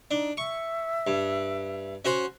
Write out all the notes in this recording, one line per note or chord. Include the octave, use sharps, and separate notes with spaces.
D4 D#4
E5 C#6
G2
C#4 F#4 C5